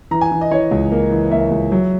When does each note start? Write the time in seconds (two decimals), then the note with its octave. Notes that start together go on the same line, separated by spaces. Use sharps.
0.11 E3 A#5
0.21 G#5
0.32 E3
0.41 D#5
0.51 E3 C#5
0.71 C#2
0.91 A#3
1.12 E3
1.31 A#3 E5
1.51 C#2
1.72 F#3